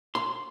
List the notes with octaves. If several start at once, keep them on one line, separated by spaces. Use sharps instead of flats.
C6